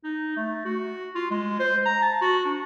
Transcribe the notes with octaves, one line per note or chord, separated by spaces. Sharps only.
D#4
A3
F#4
F4
G#3
C5
A#5
A5
F#4
D4